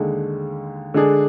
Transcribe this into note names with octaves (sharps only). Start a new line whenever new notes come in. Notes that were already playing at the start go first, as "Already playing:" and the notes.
Already playing: D#2 D3 G#3
D3 G#3 D4 G#4